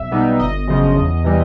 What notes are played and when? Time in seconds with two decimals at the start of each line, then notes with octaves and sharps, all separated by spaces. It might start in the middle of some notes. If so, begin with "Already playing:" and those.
Already playing: B1 E5
0.11 B2 G3 B3 D#4
0.39 G1 D#5
0.67 F#2 C#3 F3
0.96 E2
1.24 C3 E3 G3